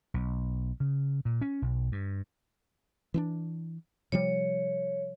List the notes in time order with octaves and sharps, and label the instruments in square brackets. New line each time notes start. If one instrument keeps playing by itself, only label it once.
[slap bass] B1
C#3
A#2
C#4
B1
G2
[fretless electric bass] E3 C4 D4
[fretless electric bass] C3 F3 G3 [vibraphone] C#5